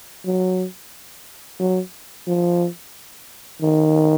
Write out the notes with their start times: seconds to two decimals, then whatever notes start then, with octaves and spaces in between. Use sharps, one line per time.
0.25 F#3
1.60 F#3
2.27 F3
3.61 D#3